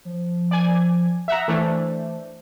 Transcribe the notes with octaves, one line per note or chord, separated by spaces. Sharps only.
F3
D5 G#5 G#6
E5 F#5 A#5 D#6
E3 A3 D4 C5